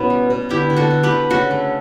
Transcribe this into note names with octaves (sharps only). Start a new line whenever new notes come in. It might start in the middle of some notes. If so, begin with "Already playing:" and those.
Already playing: B2 B3 C#4 E4
G3
B2
D3 E4 G4
D3
F#4 A4
D3
G4 B4
D3
C#3 F#4 A4
A3